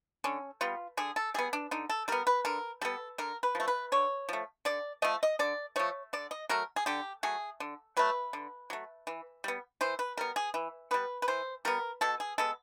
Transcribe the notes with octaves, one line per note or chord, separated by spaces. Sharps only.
D3 C#4
G3 B3 F4
D3 G#4
A4
G3 B3 G#4
D4
D3 D#4
A4
G3 B3 A#4
B4
D3 A#4
G3 B3 A4
D3 A#4
B4
F3 A3
B4
D3 C#5
F3 A3
D3 D5
F3 A3 D#5
D#5
D3 D5
F3 A3 C#5
D3 D5
D#5
F#3 A3 A#4
G#4
D3 G4
F#3 A3 G#4
D3
F#3 A3 B4
D3
F#3 A3
E3
G3 B3
E3 C5
B4
G3 B3 A#4
G#4
E3
G3 B3 B4
B4
E3 C5
G3 B3 A#4
B2 A4
G#4
G#3 B3 A4